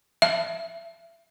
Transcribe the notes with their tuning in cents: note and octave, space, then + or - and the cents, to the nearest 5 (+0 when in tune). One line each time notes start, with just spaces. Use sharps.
E5 +20